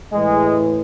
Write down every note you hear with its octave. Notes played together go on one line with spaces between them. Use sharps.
A2 E3 G#3